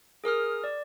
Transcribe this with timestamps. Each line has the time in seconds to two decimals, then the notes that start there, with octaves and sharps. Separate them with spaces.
0.24 G#4 A#4 D#6 F6
0.64 D5